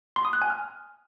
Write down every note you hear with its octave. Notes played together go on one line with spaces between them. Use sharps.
C6
D#6
F#6
G#5
F6